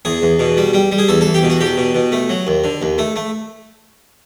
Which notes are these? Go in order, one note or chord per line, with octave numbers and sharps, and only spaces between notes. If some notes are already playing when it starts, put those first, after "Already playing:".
E2 G#4
E2
B2
G3
G3
G3
G#4
E2 A4
A4
E2
G4
B2
F#4
E2 G4
B2
B2
A3
F#3
D#2
D3
D#2
A3
A3